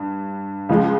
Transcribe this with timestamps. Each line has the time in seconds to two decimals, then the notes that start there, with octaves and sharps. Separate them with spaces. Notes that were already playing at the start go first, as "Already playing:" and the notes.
Already playing: G2
0.69 C#2 C#3 F3 G#3